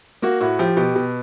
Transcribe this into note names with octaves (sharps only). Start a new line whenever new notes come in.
A#3 F#4
A2 F#4
F3 G4
B2 G4
B2